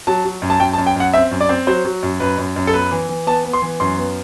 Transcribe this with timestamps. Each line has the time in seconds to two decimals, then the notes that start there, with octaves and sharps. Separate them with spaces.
0.07 F#3 A5
0.25 F#3
0.42 F#2
0.50 A5
0.60 F#2 G5
0.73 A5
0.78 F#2
0.86 G5
0.96 F#2 F#5
1.13 C4 E5
1.31 F#2
1.41 D5
1.49 C4
1.67 F#3 C5
1.85 F#3
2.03 F#2
2.20 F#2 B4
2.38 F#2
2.56 F#2
2.67 A4
2.73 B3 B4
2.91 E3
3.09 E3
3.27 B3 A5
3.45 B3
3.53 C6
3.62 E3
3.80 F#2 C6
3.98 B3